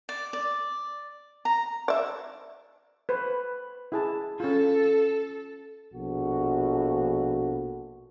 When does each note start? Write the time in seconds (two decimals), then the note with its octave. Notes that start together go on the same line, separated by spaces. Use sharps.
0.09 D5
0.33 D5
1.45 A#5
1.88 D5 E5
3.09 B4 C5
3.92 E4 G#4 A5
4.40 C#4 F4 A4
5.93 A#1 B2 F3 F#4 A4